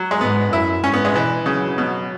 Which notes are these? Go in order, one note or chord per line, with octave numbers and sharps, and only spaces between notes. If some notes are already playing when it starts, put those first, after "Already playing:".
Already playing: F#3
G#3
G#2 B3
F#2 E4
G#2 C#4
B3
G#3
B2 E3
C#3 F#3
B2 F#3